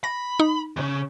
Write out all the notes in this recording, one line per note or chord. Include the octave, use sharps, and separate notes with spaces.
B5 A#6
D#4
E2 C#3